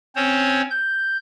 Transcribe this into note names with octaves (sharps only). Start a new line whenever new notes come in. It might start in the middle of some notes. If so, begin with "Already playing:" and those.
C4 C#4 C5 C#5
G6